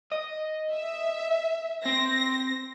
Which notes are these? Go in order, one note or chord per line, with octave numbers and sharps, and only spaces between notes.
D#5
E5
C4 A#6